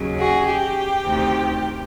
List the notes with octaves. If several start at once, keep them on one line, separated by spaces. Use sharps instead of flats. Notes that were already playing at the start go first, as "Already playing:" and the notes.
Already playing: D#2 C#3 F#3
F#4 G#4
G4
D2 C3 D#3